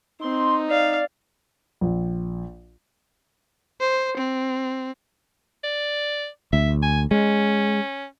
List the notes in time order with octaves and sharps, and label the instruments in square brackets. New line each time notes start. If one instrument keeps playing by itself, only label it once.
[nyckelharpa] C4 [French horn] D#4 [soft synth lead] C6
[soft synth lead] D5 [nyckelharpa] F5
[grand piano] A#1
[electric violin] C5
C4
[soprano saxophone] D5
[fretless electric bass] D2 [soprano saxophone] E5
[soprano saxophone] G#5
[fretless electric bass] G#3 [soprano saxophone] C#4